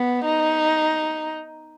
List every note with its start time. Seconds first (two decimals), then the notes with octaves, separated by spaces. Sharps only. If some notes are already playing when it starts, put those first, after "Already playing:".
Already playing: B3
0.25 D#4